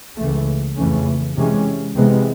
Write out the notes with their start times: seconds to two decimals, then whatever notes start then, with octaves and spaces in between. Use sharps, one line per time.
0.17 C#2 C#3 E3 A3
0.77 F2 C#3 E3 A3 C#4
1.37 C3 E3 G#3 C#4
1.95 C3 E3 G#3 B3